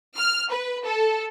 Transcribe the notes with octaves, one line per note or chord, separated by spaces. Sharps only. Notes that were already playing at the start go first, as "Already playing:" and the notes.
F6
B4
A4